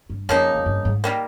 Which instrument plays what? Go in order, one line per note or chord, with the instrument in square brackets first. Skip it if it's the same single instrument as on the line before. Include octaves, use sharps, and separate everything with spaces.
[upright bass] G2
[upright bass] F2 [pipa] C#3 F3 A#3 D#4
[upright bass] F2
G2
G#2
[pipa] D#3 G3 A#3